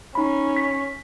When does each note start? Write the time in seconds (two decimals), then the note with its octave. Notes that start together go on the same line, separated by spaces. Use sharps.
0.15 C#4 D#4 B5
0.56 B6